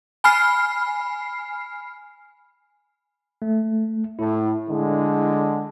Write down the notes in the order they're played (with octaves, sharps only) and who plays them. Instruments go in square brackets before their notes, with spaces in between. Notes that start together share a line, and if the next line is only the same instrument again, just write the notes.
[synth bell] G#5 B5 F6 C7
[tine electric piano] A3
[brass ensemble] A2 [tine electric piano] E4
[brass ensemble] D3 G#3